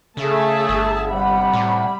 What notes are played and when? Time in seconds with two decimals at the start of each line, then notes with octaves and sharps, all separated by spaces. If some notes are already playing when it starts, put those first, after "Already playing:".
0.17 C#3 A3 G#4 E5 A5
0.69 G1
1.10 C3 G3 F#5 B5
1.53 A2